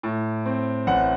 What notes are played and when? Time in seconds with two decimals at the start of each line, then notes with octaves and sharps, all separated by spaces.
0.03 A2
0.46 C4
0.87 A1 F#5